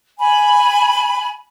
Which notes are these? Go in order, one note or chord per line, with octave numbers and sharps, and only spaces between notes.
G#5 B5